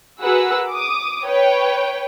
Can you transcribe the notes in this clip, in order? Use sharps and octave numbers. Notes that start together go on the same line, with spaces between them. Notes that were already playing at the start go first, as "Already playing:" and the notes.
F#4 G#4 A#4 B4 F#5 E6
D6 D#6
B4 C#5 G5